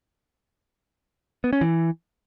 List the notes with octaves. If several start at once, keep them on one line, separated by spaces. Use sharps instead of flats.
B3
C#4
E3